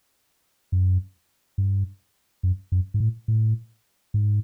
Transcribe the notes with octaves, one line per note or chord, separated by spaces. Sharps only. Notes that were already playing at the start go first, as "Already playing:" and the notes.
F#2
G2
F#2
F#2
G#2
A2
A2
G#2